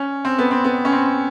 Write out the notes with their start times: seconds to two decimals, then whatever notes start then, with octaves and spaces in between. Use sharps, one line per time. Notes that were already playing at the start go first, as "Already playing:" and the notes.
Already playing: C#4
0.25 C4
0.38 B3
0.51 C4
0.65 B3
0.85 C#4
0.92 C4